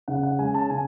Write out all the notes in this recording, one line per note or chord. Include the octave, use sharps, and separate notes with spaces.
C#3 F#5
F#5
G#3 C#4 G#5
A5
C#3 G#5